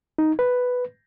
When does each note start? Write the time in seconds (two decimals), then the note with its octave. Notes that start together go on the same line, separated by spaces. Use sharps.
0.18 D#4
0.39 B4